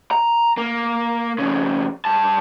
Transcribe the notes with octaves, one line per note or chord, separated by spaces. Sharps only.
A#5
A#3
F2 C#3
G2 A5